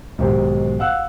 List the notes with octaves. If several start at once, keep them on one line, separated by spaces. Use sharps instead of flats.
B1 G#2 D#3 G4 C5
F5 F#5 E6 F#6